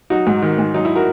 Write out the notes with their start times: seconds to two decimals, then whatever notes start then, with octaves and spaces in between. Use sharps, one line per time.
0.10 F#3 D#4 F#4
0.27 G#2
0.42 D#3
0.58 G#2
0.74 F#3 D#4
0.85 E4
0.95 F#4 A#4